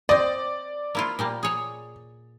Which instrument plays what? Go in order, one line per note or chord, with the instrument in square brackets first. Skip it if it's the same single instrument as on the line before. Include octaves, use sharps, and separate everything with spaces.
[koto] C4 D#5 [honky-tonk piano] D5
[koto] A#3 E4 F4
A#2 G3 A#3
G#4 C#5